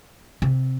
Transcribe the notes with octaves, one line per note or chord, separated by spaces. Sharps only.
C3